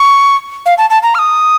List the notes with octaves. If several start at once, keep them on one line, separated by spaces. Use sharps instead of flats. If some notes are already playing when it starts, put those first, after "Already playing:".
Already playing: C#6
F5
A5
A5
A#5
F6
D#6